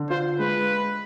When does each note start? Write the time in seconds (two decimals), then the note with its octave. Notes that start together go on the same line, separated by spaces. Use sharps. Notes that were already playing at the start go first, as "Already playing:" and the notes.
Already playing: D3
0.10 F4 C5
0.39 G#3 B4